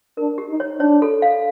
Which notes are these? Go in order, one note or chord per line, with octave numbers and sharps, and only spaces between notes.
D4 A#4
G4
D#4
C#5
D4 C#5
A4
F5